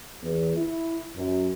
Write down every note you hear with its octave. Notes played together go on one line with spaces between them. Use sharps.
E2
E4
F#2